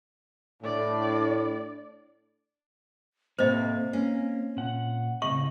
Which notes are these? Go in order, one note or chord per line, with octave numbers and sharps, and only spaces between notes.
A2 D4 D5
A2 C3 A#3 C4 C5 D#5
A#3 C#4
A#2 F#5
A2 C#3 C4 D#5 C#6